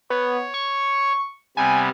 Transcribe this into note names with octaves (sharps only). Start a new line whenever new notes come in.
B3 C#5
C#6
C3 G3 B3 G#5